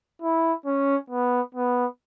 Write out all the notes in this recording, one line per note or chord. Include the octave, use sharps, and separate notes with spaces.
E4
C#4
B3
B3